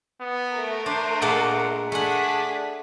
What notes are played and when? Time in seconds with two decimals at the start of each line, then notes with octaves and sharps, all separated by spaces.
0.21 B3
0.53 A3 A#4
0.86 D4 C5
1.22 A#2 G#3 A#3 F#5
1.92 A3 D4 G#4 F#5 B6